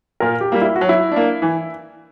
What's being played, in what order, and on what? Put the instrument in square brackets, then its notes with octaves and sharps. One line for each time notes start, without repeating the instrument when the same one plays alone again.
[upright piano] A#2 [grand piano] A#4
[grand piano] G4
[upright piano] G3 A#3
[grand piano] E4
F#4
[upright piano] F#3
[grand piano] E4
[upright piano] A#3 D4
E3